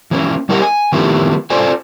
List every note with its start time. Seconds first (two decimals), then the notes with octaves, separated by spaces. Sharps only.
0.11 E3 A#3 C#4
0.49 G3 E4 G4 A#4 D#5 F#5
0.62 G#5
0.92 D#3 F3 A3 B3 E4 G4
1.50 F4 A4 C5 D5 G#5